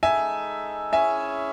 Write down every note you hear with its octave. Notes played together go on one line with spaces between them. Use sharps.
G#3 D#4 A4 E5 G#5
C#4 E4 G#4 C#5 E5 G#5